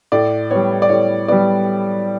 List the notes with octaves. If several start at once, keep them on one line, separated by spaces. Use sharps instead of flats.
A2 D5
G3 B3 C#5
D5
A2 C#5
G3 B3 D5